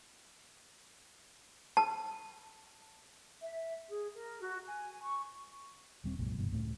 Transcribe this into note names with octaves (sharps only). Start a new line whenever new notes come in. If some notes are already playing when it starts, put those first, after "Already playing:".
A5
E5
G#4
A#4
F#4
G#5
C#6
D#1 G3 C4
C2 F#2 A#2 G#3
F#1 G2 B2 E3
C#2 A2 C#3 A3